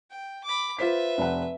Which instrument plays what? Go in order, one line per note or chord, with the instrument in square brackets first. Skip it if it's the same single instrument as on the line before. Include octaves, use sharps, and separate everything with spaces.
[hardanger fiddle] G5
B5 D6
[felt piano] F4 C5 B6 [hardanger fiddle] B4 E5
[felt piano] F1 F#5